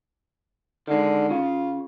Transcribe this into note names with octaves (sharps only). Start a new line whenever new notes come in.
D3 D#3 G#3
C#3 F4